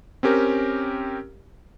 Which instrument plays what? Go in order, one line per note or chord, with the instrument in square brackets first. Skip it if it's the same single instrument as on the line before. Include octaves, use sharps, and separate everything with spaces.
[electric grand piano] C4 C#4 G4 A#4